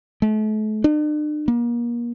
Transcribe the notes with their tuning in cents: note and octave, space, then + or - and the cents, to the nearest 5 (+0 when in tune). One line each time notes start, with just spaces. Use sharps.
A3 -40
D4 +45
A#3 +35